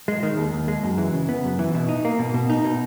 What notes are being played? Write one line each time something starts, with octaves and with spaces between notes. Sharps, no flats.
G#3
D#3
D#2
D#2
G#3
F#2
E3
C#3
B3
F#2
E3
B2
D#4
A#3
B2
B2
D#4
B2